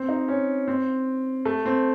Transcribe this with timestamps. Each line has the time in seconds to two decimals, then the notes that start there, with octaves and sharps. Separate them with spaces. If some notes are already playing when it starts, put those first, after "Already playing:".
Already playing: C4
0.08 D#4
0.28 C#4
0.68 C4
1.45 A3
1.66 C4